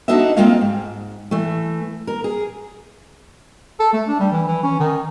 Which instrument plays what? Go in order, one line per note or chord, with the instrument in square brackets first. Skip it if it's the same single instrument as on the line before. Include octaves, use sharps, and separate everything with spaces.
[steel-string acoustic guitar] D4 D#4 F#4 A4 D#5 E5
G#3 A#3 C4 F4 D#5 F5
G#2
E3 A3
A#4
G#4
[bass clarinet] A4
A3
D4
G3
E3
E3
C#4
D#3